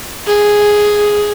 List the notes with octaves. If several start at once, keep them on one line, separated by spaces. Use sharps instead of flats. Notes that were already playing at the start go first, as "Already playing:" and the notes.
G#4